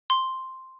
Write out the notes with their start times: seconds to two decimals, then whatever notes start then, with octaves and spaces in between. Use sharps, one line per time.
0.10 C6